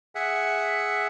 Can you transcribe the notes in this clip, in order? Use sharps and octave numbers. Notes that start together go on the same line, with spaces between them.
G#4 E5 F#5